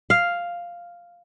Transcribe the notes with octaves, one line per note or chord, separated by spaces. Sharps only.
F5